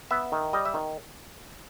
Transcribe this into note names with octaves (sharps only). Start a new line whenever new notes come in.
B3 E5
D#3
G3 D#5
E5
D#3